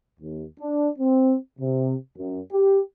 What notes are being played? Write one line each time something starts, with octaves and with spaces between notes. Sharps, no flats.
D#2
D4
C4
C3
F#2
G4